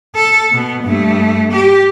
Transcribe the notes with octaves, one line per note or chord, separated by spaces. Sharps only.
A4
B2 B3
G2 A3
G4